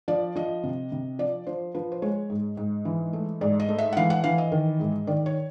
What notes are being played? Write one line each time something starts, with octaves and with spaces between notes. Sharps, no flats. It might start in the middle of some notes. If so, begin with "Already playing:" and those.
F3 D5
F3 D#5
C3
C3
F3 D5
F3 C5
F3 B4
C5
G#3 C#5
G#2
G#2
E3
A3
G#2 D5
D#5
A3
E5
F#5
E3 F5
F#5
E3 F5
D#5
D#3
G#2
D#3 D5
C#5